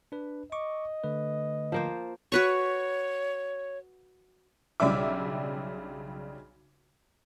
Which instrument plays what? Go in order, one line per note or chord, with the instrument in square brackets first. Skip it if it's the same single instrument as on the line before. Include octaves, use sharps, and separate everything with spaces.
[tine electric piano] D4 B4
[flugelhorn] D#5 [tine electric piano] C#6 D6
[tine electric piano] D3 A3 B4
[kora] F3 A#3 C5
[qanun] F#4 B4 C#6 [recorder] C#5
[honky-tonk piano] B1 C#3 G3 D4 E5 D6